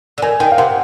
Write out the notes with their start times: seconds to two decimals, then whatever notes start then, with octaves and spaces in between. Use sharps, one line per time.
0.18 D3
0.22 D#3 G#5
0.40 D#3 G5
0.52 F5
0.58 C3 F#5